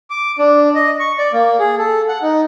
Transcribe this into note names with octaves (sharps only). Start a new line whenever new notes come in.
D6
D4
D#5
C#6
D5
A#3
G#4
A4
F#5
D#4